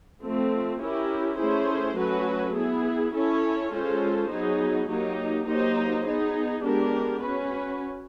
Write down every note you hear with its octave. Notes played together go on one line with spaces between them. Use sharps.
F3 A3 C4
C#4 E4 G4 A#4
A3 C#4 E4 G#4 C5
F#3 A3 C#4 F#4 B4
B3 E4 G#4
C#4 E4 A4 C#5
G#3 C#4 F4 A4 C5
F#3 B3 D#4 G#4
F#3 A#3 D#4 G4
F#3 A#3 D#4 G4 C5
B3 D#4 G#4
G#3 B3 D4 G4 A#4
C#4 F#4 B4